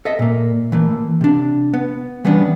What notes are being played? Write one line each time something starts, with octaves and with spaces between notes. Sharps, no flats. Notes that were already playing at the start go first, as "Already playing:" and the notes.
A4 D#5 E5
A#2 A#3
E3 A3 A#3
C3 D4
B3
E3 G3 B3 C#4 D4